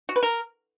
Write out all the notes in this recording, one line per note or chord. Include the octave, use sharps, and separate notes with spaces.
F#4
B4
A#4